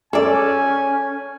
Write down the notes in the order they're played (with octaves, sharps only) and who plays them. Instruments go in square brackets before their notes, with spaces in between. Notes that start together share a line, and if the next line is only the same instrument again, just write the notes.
[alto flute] C#4 [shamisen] G#4 D5 [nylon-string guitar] A4 [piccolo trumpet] G#5